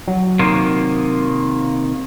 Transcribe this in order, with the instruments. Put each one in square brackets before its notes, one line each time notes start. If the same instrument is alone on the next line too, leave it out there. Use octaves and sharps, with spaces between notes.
[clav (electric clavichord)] F#3
[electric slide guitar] C3 D#3 A#3